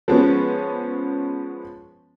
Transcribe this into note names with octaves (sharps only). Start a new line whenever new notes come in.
F3 G#3 B3 C#4